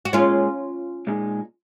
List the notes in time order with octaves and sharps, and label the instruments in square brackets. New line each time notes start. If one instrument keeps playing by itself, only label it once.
[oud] F#4
[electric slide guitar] A#2 G#3 D#4 G#4 [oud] C#4 F4
[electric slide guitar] A#2 G#3 D#4 G#4